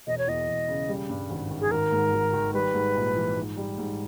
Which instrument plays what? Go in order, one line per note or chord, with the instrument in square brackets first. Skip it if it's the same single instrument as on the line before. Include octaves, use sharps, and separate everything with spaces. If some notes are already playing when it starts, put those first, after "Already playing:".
[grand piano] E1 [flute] D#5
[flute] C#5
[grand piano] E2 [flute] D#5
[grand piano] E1
C#3
G3
G2
G#1
D#3
[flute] G#4
[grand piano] G#1 [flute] A#4
[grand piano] G#2
G#1
D#3
[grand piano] G3 [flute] B4
[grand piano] G#2
A#1
E3
G#2
G3
G#2